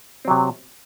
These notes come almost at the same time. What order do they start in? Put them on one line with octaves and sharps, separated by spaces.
C4 F#3 C3